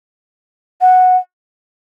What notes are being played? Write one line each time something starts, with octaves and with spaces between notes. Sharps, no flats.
F#5